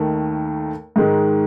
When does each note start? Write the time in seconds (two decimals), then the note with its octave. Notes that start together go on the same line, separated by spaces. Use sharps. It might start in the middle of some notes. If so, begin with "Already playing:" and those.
Already playing: D#2 D#3 A3
0.96 G#2 D#3 G#3